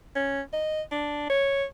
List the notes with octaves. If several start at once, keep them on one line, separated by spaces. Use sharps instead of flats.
C#4
D#5
D4
C#5